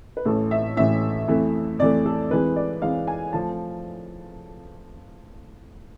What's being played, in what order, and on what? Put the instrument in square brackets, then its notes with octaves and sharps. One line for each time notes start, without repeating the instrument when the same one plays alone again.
[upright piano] B4
A1 A2 E3 A4
E5
A1 A2 E3 E5
F2 E3 A3
F2 E3 A3 D5
A4
F2 E3 G#3 B4
D5
F2 E3 G#3 F5
G#5
F3 A3 A5